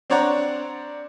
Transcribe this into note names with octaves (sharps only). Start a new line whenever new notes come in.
C4 D4 C#5 D5 F#5 A#5